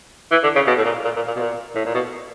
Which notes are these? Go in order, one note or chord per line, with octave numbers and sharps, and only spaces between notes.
E3
D3
C#3
B2
A2
A#2
A#2
A#2
A#2
B2
A#2
A2
A#2
B2